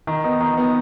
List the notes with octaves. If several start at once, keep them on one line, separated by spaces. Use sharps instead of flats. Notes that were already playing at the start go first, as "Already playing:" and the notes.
D#3
B3 D#4
D#3
B3 D#4